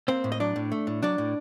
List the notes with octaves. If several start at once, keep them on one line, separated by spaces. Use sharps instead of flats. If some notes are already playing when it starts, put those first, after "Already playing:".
A#3 C4 C5
A2
D#5
F#3 D4 D5
A2
A3
A2
F#3 D4 D5
A2